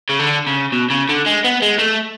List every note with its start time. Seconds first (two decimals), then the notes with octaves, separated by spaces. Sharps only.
0.09 C#3
0.19 D3
0.47 C#3
0.72 B2
0.90 C#3
1.09 D3
1.26 G#3
1.44 B3
1.62 G#3
1.79 A3